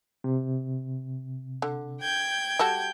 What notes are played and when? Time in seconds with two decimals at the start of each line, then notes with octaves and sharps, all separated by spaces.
0.24 C3
1.62 D3
2.01 G5 G6 G#6
2.59 G3 F#4 A4